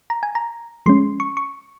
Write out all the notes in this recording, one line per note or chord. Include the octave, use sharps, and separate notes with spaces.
A#5
G#5
A#5
F3 G#3 C#4 C6
C#6
C#6